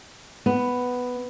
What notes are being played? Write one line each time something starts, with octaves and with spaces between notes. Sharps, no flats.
B3